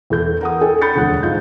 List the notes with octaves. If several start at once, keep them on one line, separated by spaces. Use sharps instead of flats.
E2 A4 G6
A#4 F#5 D#6
A4 G5 G#5
B5 G6 A6 C#7
E1 D2 F3 F#5 F#6
G#2 F4 G6